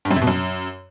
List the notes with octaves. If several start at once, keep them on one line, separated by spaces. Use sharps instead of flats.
G2
F#2
C3
B2
F#2